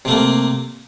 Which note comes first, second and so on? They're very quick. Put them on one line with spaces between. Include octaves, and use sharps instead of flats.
C3 A3 A#3